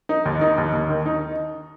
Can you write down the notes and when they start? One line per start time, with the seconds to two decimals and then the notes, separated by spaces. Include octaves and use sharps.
0.09 D#4
0.25 D#2
0.41 D#4
0.58 D#2
0.73 D#2
0.89 D#3
1.06 D#4